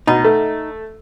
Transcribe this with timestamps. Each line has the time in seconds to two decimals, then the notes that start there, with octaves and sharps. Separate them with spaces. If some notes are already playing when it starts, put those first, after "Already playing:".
0.07 B2 D#4
0.24 A3